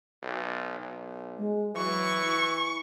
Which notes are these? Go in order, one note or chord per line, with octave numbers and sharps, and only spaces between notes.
B1
B1
G#3
E3 F#3 C#6
E4